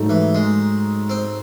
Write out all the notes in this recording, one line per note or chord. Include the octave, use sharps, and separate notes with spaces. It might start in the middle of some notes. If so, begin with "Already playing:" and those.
Already playing: G#2 F#3 A3 D#4 A4
E3
G#3
C4